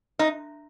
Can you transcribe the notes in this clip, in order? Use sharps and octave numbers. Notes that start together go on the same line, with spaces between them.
D#4